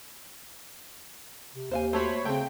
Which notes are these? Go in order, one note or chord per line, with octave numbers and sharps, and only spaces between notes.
C3
D#2 C5 F5 G#5
A3 F#4 C5 C#5 B5
C#3 A3 C4 G5